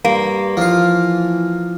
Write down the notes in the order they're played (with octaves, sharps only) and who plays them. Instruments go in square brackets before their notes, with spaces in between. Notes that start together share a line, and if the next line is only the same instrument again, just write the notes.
[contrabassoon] G2 [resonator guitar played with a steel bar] A#3
[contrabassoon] E3 [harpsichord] F3 F4